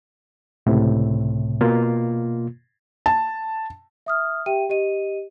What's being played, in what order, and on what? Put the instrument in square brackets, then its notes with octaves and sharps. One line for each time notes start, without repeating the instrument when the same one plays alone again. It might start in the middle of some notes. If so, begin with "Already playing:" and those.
[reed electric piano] C#2 A2 C3
B2 A#3 F4
[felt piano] A5
[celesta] E5 D#6 F6
G4 E5 G5 D#7
G4 D#5 D#7